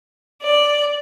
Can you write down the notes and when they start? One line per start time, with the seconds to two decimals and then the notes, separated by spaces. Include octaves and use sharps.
0.44 D5